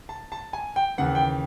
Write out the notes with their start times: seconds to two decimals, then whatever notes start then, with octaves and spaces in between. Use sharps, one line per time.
0.09 A5
0.32 A5
0.53 G#5
0.76 G5
0.98 D#2 C#3 E3 F#5
1.15 G5